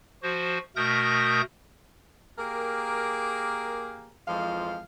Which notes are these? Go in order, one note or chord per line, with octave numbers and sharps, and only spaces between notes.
F3 F#4 C5
B2 A3 A#4 D#6 G6 A#6
A#3 G4 G#4 A#4
F2 E3 F3 G#3 F5